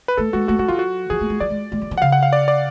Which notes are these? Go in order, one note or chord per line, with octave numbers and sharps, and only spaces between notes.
B4
A3 A4
G#3 F#4
A3 F#4
G#3 F#4
F#3 F4
F#4
F3 G#4
A3
G#3
F#3 D5
G#3
G#3
F#3
F3
F#5
C#3 F5
F#5
F5
D5
D5